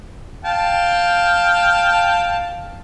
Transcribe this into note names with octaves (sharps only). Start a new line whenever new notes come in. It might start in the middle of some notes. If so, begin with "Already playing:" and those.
F5 G5 A5